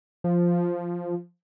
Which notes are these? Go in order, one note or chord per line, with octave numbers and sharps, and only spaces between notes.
F3